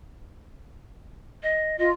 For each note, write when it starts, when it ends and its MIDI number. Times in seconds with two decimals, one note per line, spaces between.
1.43 1.77 75
1.79 1.91 65
1.79 1.89 75